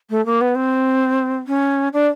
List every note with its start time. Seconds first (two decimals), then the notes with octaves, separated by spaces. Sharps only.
0.10 A3
0.26 A#3
0.41 B3
0.55 C4
1.47 C#4
1.93 D4